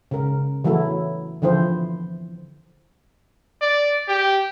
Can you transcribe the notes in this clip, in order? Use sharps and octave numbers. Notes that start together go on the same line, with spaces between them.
C#3 A#4
E3 F#3 A3 E4 A4
D3 E3 F3 E4 C5
D5
G4